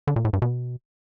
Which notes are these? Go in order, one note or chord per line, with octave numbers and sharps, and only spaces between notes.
D3
A#2
A2
G2
B2